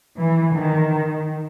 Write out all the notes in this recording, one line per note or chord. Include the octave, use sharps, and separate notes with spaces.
E3
D#3